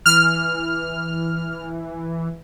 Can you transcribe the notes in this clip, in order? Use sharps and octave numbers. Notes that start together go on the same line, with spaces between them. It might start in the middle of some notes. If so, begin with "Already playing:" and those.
E3 F6